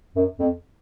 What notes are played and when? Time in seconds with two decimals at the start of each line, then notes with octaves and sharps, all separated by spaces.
0.16 F#2
0.39 F2